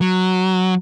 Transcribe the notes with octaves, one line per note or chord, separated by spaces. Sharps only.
F#3